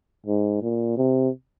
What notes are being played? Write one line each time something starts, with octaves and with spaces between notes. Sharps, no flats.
G#2
A#2
C3